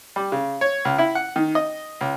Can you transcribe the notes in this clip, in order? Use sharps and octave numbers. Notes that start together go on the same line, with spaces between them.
G3
C#3
C#5
C#2
E4
F#5
D#3
D#5
C#2